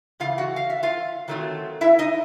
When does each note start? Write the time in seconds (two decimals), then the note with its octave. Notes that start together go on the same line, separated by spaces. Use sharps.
0.20 C#3 E3 A3 F4 F5
0.38 F#4 F#5
0.56 F5
0.70 E5
0.83 F4 F5
1.28 D#3 F#3 A3 C4 F4
1.81 E4 E5
1.99 D#4 D#5